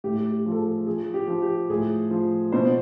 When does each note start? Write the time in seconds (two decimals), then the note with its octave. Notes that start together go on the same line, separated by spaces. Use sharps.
0.04 A2 G4
0.31 G4
0.46 F3
0.52 A4
0.59 G#4
0.87 F3 G#4
1.14 G4
1.27 F3
1.42 G4
1.69 A2 G#4
2.11 F3
2.52 B2 C5